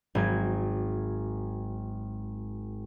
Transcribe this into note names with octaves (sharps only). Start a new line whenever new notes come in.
G#1 F#3 G#6